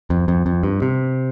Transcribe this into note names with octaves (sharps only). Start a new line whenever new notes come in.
F2
F2
F2
G2
C3